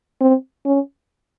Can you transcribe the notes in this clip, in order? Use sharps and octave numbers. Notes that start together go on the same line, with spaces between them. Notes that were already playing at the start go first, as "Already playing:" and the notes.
C4
C#4